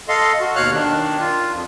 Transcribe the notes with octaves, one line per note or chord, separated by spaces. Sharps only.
A4 D#5 F5 C6
F#4
D#2 B2 C#5 F5 F6 F#6
D#3 D4
F4
F2